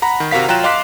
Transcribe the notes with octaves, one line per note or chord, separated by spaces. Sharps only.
F#5 A#5 B5
D#3
C3 F#4 A#4 F5 B6
F#3 F4 G5 A#5 F#6 E7
D#5 F5 C6 D6 F#6 B6